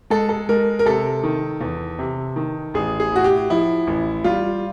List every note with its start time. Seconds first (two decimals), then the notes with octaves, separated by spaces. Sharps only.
0.10 G#3 A4
0.29 A4
0.49 G#3 A#4
0.79 A#4
0.86 C3 A4
1.23 D#3
1.61 E2
1.99 C3
2.36 D#3
2.74 A1 G#4
3.00 G#4
3.12 A2 F#4
3.24 G4
3.50 F3 E4
3.87 A1
4.24 G3 F4